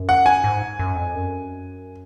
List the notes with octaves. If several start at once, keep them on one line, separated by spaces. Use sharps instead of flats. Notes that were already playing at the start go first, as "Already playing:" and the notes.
Already playing: F#2
F#5
G#5
G#2
F#2
F2
F#2